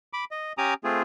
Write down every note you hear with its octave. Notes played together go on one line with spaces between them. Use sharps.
B5 D6
D#5
C#4 G4 G#5 A#5 D6 D#6
A3 C4 F4 G#4